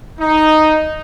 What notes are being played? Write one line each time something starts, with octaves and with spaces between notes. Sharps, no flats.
D#4